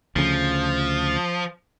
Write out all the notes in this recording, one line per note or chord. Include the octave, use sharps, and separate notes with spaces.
D2 C#3 F3